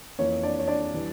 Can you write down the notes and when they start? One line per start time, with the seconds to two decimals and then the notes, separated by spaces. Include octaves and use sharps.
0.19 F2 E3 A#3 C#4 C#5
0.43 D4 D5
0.59 C#5
0.68 D4 D5
0.94 E3 G3